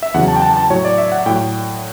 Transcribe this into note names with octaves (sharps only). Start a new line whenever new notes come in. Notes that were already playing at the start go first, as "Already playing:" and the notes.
E5
E2 C#3 F#3 F#5
A5
G5
A5
A5
A2 F#3 C#5
D5
E5
F#5
A2 F#3 G5